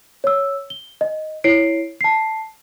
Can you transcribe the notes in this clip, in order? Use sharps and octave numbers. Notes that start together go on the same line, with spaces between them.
C#5 E6
G7
D#5
E4 C#5 C7 D7
A5 C7